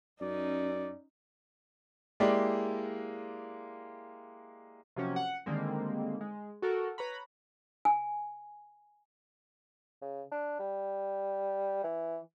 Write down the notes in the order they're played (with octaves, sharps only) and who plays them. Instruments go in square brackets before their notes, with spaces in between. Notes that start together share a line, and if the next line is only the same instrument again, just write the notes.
[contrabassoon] F#2 [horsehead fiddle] C#4 D#4 [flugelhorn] D5
[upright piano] G#3 A#3 E4 G4 D5
[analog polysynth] C3 F3 F#3 A#3 C#4
F#5
D3 D#3 G3 G#3 A#3 C4
G#3
F#4 A4 A#4
B4 C#5 A#5 B5
[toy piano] G#5
[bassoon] C#3
D4
G3
E3